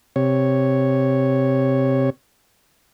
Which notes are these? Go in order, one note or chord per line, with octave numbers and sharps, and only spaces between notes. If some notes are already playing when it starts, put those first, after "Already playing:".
C3 C#5